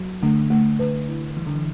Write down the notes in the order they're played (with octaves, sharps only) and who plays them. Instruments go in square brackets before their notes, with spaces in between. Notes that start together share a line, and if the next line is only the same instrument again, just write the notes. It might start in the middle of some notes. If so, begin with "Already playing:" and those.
Already playing: [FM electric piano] F#3
[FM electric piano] D3 [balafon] A3
[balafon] A3
[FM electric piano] D3 [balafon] B4
[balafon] E4
[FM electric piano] E3 [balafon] G3
[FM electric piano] D3
E3